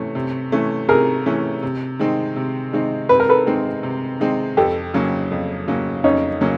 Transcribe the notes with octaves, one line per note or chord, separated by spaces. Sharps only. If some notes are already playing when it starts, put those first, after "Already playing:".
Already playing: C3 E3 A3 C#4
C3
E3 A3 C#4
C3 G#4 A#4
E3 A3 C#4
C3
D#3 G#3 C4 D#4
C3
D#3 G#3 C4 D#4
C3 B4
A#4
A4 B4
D#3 G#3 C4 D#4
C3
D#3 G#3 C4 D#4
F2 G4 A4
C#3 F#3 A#3 C#4
F2
C#3 F#3 A#3 C#4
F2 C#4 D#4
C#3 F#3 A#3 C#4